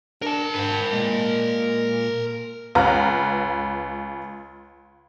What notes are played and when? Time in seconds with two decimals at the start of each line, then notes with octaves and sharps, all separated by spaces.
0.22 D4 A#4 A5
0.55 G#2 B4 G5
0.93 A#2 G#3
2.75 C#2 B4 A#5 F6